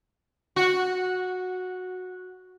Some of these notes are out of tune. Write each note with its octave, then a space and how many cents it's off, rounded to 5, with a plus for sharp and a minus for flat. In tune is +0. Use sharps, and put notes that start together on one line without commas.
F#4 -10